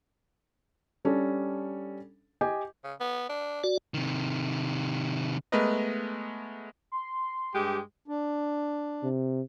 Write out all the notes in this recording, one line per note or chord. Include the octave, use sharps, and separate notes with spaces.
G3 C#4 D4 A4
G4 D#5 G5 G#5
C#3
B3
D4
F#4 D5
C3 D#3
G#3 A3 B3 A#4 B4 D#5
C6
G2 G#3 G4
D4
C3